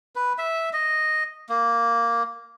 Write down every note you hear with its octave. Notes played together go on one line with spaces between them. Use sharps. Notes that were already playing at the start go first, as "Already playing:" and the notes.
B4
E5
D#5
A#3